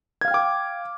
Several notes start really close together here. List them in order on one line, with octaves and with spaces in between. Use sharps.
G#6 F5 F6 G5 D6